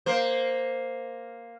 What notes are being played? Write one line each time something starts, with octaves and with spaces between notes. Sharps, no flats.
A#3 C5